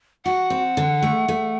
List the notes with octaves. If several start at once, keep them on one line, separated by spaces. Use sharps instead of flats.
F#4 F#5
C4
D3
A3
A3